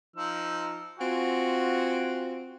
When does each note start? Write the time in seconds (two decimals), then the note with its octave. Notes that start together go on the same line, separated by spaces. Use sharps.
0.16 F3 D#4 E6
0.99 C4 F4 F#4 G#5